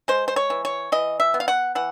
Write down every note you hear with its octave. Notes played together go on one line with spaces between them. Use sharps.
G#3 C5
C5
C#5
E3
C#5
E3 D#5
E5
B3
F5
F#5
E3 F#5